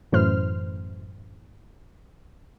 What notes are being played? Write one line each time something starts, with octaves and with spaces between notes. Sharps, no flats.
F#2 A2 E3 C5 F6